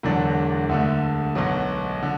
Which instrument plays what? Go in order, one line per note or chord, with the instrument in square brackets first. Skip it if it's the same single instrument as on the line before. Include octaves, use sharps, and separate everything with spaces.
[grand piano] E1 E2 D3 F#3 D4
D2 D3 A3
B1 B2 F#3
D3